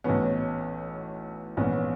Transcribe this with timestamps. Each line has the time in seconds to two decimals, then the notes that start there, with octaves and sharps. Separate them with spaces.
0.04 B1 A2 E3 B3 C#4
1.57 A#1 G#2 E3 B3 C#4